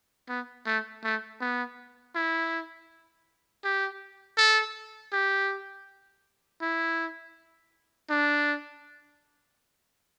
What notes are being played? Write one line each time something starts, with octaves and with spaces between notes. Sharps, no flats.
B3
A3
A3
B3
E4
G4
A4
G4
E4
D4